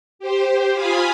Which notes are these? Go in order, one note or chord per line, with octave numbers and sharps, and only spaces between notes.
G4 C5
F4 F5 G#5 B5 D#6